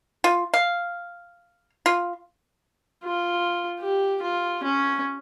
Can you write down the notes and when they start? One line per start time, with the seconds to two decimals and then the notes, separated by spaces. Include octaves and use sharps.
0.24 F4
0.54 F5
1.86 F4
3.04 F4
3.80 G4
4.22 F4
4.63 C#4